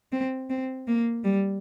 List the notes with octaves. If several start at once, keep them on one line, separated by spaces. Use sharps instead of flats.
C4
C4
A#3
G3